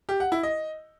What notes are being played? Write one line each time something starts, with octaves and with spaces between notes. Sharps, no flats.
G4
F#5
E4
D#5